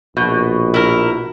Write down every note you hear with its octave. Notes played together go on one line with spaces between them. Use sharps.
A#1 B2
E4 A#4